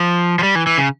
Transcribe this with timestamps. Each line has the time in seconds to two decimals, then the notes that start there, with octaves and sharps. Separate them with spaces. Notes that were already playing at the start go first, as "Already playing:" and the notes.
Already playing: F3
0.39 F3
0.43 G3
0.55 E3
0.67 E3
0.78 C#3